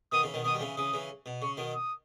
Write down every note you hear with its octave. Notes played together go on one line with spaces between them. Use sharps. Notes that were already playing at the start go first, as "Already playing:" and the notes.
B2 D#3 D#6
C#3 E3
B2 D#3
B2 D#3 D#6
G3
C#3 E3
C#3 E3 D#6
C#3 E3
B2
C#3 C#6
B2 D#3
D#6